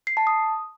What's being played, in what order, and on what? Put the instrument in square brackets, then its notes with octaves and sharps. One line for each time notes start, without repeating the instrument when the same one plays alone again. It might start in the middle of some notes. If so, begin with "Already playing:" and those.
[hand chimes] C7
A5
D#6